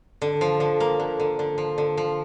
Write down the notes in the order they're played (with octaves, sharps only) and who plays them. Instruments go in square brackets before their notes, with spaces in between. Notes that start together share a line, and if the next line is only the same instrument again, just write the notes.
[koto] D3
F3
D3
A#3
D3
D3
D3
F3
D3
F3